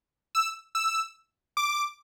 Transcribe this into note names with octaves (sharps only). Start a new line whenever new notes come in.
E6
E6
D6